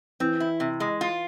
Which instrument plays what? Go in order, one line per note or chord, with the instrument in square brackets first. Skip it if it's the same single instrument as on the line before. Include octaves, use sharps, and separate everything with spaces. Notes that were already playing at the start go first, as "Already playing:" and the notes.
[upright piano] E3 [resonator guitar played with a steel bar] C4
[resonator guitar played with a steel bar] E4
C3
G#3
F4